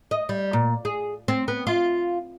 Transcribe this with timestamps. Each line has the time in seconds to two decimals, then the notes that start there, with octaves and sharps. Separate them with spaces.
0.11 D#5
0.29 G3
0.53 A#2
0.85 G#4
1.28 C4
1.48 B3
1.67 F4